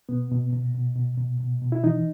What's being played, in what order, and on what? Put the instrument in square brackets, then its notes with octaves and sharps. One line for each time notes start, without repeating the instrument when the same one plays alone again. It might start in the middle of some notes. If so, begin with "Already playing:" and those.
[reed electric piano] B2 B3
B2
B2
B2
B2
B2
B2
B2
E4
E3 D#4